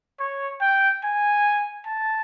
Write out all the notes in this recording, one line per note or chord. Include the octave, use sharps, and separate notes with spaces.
C#5
G5
G#5
A5